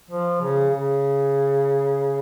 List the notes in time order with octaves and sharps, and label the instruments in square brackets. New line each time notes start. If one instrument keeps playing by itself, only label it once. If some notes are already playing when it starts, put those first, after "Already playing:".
[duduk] F3
C#3
C#3